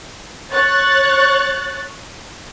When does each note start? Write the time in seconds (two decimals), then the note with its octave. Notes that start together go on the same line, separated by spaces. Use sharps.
0.53 C#5 F#6 A6